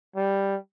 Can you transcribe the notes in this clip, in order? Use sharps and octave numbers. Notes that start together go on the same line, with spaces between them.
G3